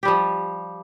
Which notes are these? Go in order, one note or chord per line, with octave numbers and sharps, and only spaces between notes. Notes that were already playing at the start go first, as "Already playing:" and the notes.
F3 G3 G4